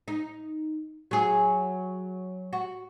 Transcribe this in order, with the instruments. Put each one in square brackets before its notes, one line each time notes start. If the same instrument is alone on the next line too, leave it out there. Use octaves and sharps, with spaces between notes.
[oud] D#4
F#3 G#4
F#4